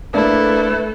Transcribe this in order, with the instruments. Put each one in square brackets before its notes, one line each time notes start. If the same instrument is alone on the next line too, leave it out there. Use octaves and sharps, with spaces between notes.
[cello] A3 A4 [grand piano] A#3 D4 [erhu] E4 [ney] B4